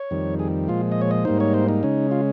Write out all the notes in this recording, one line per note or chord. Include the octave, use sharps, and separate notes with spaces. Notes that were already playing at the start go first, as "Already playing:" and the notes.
Already playing: C#5
F2 D#3 G3
G#4
A#2 F3 G#3 F4
D#5
C#5
D#5
G#2 G3 A#3 D#4 C5
C#5
C5
D#4
C#3 G#3 C#4
F4